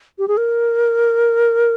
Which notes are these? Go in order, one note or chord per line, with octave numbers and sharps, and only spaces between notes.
G4
G#4
A#4